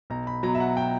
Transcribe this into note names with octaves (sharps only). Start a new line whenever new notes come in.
B1 A#5
B5
B2 F#3 A#5
E5
F#5
G5